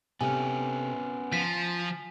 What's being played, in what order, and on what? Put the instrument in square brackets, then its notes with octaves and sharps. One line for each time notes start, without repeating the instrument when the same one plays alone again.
[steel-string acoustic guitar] C3 A3 [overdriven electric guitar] B3 C#4 [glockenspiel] G#5
[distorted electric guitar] F3 [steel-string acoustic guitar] F4 [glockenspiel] B6